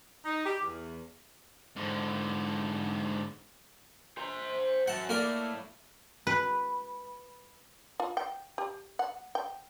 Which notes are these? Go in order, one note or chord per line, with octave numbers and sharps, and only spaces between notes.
D#4
G4
E2
G#2 D3
C5 A#5
F#2 F#5 A5
A2 A#3 A#4 D5
B4
F4
G5
G4
F#5
G5